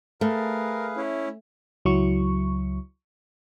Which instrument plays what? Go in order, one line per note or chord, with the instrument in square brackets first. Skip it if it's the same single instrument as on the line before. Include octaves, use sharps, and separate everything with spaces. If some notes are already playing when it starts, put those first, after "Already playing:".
[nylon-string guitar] A3 [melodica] G#4 B4 F5 [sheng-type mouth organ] A#4
[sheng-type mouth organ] C#4 E4
[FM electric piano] C#2 F#3 E4 C#6